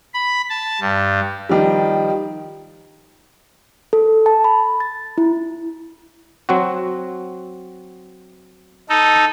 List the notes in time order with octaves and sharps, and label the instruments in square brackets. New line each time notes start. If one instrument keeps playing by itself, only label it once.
[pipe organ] B5
A5
G2
[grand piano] D#3 F3 G3
[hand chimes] A4
A5
B5
A6
E4
[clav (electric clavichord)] F#3 C4 F#4
[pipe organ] D#4 A4